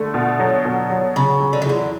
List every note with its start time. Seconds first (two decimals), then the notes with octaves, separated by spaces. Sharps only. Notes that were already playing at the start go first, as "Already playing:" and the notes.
Already playing: D3 A3
0.14 B2
0.40 F#3
0.65 B2
0.90 F#3
1.16 C#3 F#3
1.40 F#3
1.53 D3
1.62 C#3
1.66 E2 D3